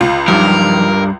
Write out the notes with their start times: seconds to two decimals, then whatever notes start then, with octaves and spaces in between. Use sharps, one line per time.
0.01 C#2 F4
0.28 G2 F3 F#3 D#4 A#4